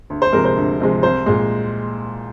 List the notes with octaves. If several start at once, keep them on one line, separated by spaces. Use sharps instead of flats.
D2
C5
C3 F3 G#3 A#4
C5
D2
C3 F3 G#3
C2 C5
A#2 G#3